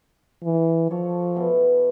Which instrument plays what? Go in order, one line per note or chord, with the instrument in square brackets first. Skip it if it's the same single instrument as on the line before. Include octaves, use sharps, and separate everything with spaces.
[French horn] E3
[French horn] F3 [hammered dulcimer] A4 C#5 D5
[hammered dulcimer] B2 E3